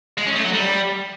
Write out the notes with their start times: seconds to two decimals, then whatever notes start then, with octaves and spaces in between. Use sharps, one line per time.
0.18 G#3
0.26 C#4
0.35 A3
0.44 F#3
0.53 G3